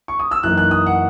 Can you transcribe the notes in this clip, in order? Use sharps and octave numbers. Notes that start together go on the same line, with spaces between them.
C#6
D#6
E6
F#2 E3 A#3 D#4 F#6
F#6
D#6
F#5